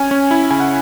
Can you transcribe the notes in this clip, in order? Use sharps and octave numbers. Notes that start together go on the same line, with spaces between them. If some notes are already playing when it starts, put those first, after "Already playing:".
Already playing: C#4 G#5
C#4
E4
C#3 G#5
F#5